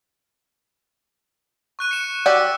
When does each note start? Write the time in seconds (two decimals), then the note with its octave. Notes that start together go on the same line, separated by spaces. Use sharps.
1.79 C#6 F#6 D#7
1.91 C#7 E7
2.26 F#4 G4 D5 E6